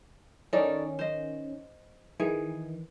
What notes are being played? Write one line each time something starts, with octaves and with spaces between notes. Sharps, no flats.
D#3 C#4 D#4 A4 D5
C5 D#5
D#3 E3 G#4